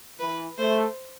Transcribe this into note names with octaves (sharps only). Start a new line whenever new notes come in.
E3 B4
A3 C5